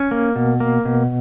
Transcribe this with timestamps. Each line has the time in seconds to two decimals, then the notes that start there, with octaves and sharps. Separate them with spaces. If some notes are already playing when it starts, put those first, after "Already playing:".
Already playing: C#4
0.11 A#3
0.36 B2
0.60 A#3
0.85 B2